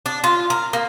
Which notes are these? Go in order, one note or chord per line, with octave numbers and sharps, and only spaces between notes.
D4
F4
A#4
A#3